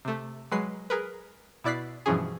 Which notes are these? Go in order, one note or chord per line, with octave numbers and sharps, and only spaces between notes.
C3 A3
F#3 G#3 B4 C7
G#4 A#4 B4
B2 E4 D5 F#6 B6 C7
G2 B2 E3 F3 C#4 G#4